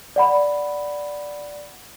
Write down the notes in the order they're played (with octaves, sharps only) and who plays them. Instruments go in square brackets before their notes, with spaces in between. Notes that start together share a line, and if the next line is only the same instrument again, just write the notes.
[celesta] D5 F#5 B5